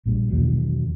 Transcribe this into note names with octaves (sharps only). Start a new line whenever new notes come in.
A#1 A#2 G3
E2 B2 D#3 F#3